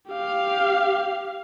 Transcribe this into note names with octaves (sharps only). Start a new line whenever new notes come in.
G4 F5